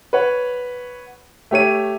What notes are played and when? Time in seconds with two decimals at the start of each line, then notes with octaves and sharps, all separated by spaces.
0.13 B4 C#5 F#5
1.51 A3 G4 C#5 D#7